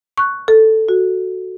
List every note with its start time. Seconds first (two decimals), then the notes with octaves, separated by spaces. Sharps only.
0.18 C#6 F#6
0.48 A4
0.89 F#4